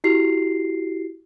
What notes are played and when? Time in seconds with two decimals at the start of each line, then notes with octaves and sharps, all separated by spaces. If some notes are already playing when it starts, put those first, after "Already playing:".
0.04 E4 F#4 G4 C7